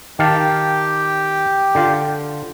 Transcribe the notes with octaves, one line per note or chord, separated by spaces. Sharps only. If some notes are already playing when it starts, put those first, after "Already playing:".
D#3 G4 F5 G5 A5
D3 F4